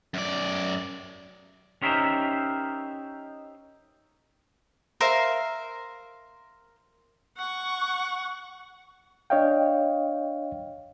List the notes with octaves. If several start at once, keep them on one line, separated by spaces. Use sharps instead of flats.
F#2 D5
C#4 D#4 G4 A#4 C5 E5
A#4 C5 E5 F5
F#5 C#6
D4 C#5 D#5 F5 G5